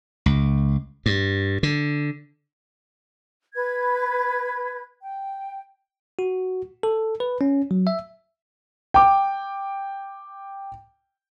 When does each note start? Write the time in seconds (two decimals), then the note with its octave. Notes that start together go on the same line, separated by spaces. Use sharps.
0.26 C#2
1.06 G2
1.63 D3
3.54 B4 G#6
5.02 G5
6.19 F#4
6.83 A4
7.20 B4
7.41 C#4
7.71 F#3
7.87 E5
8.94 G5 D6